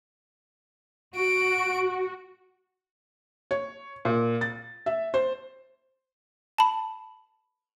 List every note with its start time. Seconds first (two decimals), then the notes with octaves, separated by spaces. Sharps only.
1.17 F#4 D7
3.51 C#5
4.05 A#2
4.41 A6
4.86 E5
5.14 C5
6.58 A5 B5